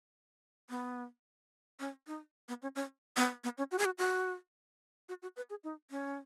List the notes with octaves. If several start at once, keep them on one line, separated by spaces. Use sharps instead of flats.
B3
C#4
D#4
B3
C#4
C#4
B3
B3
C#4
F#4
G#4
F#4
F#4
F#4
F#4
B4
G#4
D#4
C#4